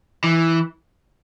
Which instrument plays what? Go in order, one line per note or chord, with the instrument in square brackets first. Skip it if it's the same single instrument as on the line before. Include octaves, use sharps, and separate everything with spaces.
[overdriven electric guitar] E3